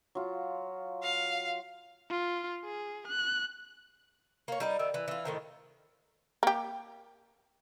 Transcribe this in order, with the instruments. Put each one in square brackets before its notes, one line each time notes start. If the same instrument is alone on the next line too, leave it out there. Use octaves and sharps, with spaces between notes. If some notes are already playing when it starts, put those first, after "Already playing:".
[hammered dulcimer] F#3 F4
[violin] F5
[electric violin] F4
G#4
F#6
[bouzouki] A#3 C#5
G3 D#4 B4
D#3 D5 E5
E3
E3 F4
A2 D#3 C5
[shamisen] A#3 G4